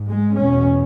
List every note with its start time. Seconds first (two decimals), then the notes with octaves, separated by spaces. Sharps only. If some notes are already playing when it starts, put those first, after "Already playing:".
Already playing: G#2
0.10 G#3
0.38 E2 B2 C#4